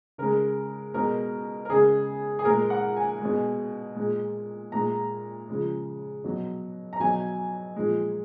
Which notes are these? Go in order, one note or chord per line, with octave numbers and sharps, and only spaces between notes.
C#3 G#3 A#4
B2 G#3 A#4
A#4
C#3 G#3 G#4
G#4
A#2 G#3 A#4
F#5
G#5
B2 G#3
A#2 G#3
A#2 G#3 A#5
C#3 F3 G#3
B2 F#3
A#5
B2 F#3 G#5
A#2 F3 G#3